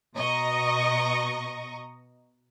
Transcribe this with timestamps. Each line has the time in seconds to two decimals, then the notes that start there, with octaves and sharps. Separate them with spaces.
0.15 B2 D#5 A#5 C#6